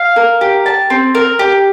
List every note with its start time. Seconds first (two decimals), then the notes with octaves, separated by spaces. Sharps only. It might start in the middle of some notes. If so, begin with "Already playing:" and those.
Already playing: F5
0.16 A#4
0.41 G4
0.66 A5
0.90 C4
1.15 A#4
1.39 G4